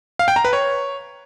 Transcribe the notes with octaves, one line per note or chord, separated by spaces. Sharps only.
F5
G5
A#5
B4
C#5